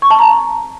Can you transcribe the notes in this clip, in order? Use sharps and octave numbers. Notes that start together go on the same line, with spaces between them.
C#6
A5
A#5